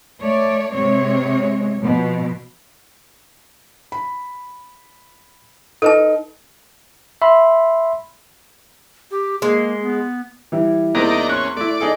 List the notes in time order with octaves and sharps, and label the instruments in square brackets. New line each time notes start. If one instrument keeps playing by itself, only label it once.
[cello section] A3 C#5 D5
C3 G#3 C4 C#5
B2 F3
[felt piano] B5
[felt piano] D#4 [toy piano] A4 B4 A5
[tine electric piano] E5 B5 C6
[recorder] G4
[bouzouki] G#3 [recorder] A#3
[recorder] B3
[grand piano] E3 G3 E4
[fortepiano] E2 A#3 C4 [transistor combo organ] D#4 D5 A#5
[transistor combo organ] C#4 [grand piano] C6 F#6
[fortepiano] A3 E4 [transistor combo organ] D5
[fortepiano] D#4 G#4 A4